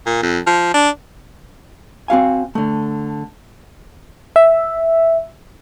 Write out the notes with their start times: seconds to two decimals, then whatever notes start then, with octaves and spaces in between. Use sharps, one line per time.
0.06 A#2
0.23 F2
0.47 F3
0.74 D4
2.08 C4 F#4 F5 G#5
2.55 D3 A3
4.36 E5